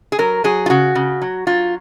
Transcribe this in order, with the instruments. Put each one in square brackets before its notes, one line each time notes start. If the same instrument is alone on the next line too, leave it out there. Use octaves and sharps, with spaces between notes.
[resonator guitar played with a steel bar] G#4
F#3 A#4
F#3 G#4
F4
C#3 F#4
C#3
F#3
F#3 F4